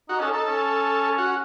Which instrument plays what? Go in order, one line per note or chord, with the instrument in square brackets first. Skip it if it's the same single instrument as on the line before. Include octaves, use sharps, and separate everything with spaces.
[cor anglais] D#4 [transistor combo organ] F#4
[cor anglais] C#4 [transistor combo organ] A4
[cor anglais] D#4 [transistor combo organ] A4
[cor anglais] C#4
[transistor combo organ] F#4